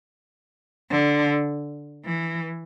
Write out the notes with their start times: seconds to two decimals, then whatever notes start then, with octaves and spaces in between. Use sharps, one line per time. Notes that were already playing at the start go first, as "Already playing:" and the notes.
0.90 D3
2.05 E3